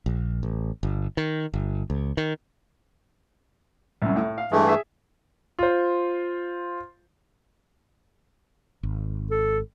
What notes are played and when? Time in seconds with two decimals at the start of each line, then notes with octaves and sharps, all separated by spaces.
0.06 A#1
0.43 A1
0.83 G1
1.17 D#3
1.54 G1
1.90 C#2
2.17 D#3
4.02 C2 F#2
4.16 A2
4.38 F5
4.52 G2 E3 G#3 A3
4.67 G#4 E5
5.59 F4 C5
8.83 G#1
9.31 A4